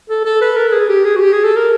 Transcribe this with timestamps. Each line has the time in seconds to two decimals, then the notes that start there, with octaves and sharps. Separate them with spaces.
0.09 A4
0.25 A4
0.41 B4
0.57 A#4
0.67 A4
0.73 G#4
0.89 G4
1.05 G#4
1.16 F#4
1.20 G4
1.33 G#4
1.44 A4
1.56 A#4